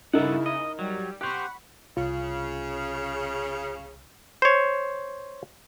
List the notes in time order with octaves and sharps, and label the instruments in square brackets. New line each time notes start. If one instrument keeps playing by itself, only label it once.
[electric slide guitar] G2 A4 F#5 [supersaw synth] C#3 E4 [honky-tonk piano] D#4 A#4
[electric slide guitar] D#5
[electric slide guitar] F#3 [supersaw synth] G3
[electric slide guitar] G4 C5 [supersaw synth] F#5 B5 C#6 [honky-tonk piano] F#6
[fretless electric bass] C2 [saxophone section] C#3 [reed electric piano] F4
[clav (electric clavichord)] C5 C#5